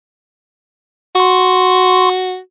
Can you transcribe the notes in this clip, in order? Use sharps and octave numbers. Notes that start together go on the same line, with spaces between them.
F#4 C6 C#6